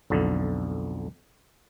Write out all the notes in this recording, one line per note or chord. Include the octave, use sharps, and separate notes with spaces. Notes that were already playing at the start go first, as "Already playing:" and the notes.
B1 F2 D3